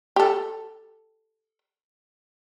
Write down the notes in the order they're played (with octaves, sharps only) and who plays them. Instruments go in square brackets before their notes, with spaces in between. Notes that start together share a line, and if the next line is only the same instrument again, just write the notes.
[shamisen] G4 A4